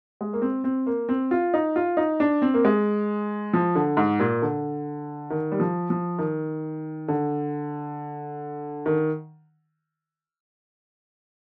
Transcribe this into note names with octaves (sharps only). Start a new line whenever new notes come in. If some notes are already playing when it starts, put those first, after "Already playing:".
G#3
A#3
C4
C4
A#3
C4
F4
D#4
F4
D#4
D4
C4
A#3
G#3
F3
D3
G#2
A#2
D3
D#3
G3
F3
F3
D#3
D3
D#3